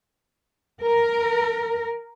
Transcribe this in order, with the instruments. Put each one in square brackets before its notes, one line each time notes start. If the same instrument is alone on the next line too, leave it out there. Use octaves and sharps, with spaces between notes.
[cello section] A#4